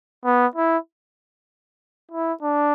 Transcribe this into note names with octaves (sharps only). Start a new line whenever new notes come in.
B3
E4
E4
D4